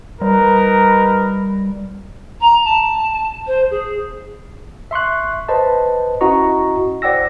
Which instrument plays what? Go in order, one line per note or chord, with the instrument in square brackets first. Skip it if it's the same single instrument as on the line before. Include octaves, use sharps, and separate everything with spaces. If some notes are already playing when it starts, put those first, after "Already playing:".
[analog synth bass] G3 [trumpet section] D#4 A#4 B4
[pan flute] A#5
A5
C5
G#4
[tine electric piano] E5 C6 C#6 F#6
B4 C5 D#5 A5
C#4 E4 F#4 D#5 A#5 C#6
C5 D5 F#5 G5 E6 A#6